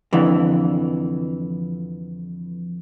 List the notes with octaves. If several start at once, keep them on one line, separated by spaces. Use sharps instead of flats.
F2 D3 E3